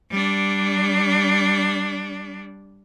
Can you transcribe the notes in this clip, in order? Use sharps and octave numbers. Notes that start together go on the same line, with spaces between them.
G3 D4